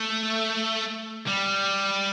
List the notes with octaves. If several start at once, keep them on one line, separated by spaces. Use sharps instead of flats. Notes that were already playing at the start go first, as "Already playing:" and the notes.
Already playing: A3
G3